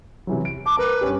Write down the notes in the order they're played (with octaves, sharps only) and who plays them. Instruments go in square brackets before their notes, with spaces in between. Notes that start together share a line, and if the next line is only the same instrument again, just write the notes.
[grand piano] C3 E3 F#3
D7
[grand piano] A5 [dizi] D6
[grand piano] A#4 [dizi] B4
[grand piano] G2 C#4 G4